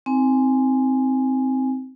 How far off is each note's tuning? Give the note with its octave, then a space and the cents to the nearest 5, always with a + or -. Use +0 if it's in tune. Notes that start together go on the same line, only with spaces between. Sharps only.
C4 -5 D#4 +25 G#5 +0